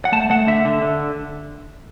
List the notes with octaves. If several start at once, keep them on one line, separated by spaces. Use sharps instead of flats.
F#5
A3 A5
A3 F#5
D3 E5
D3
D3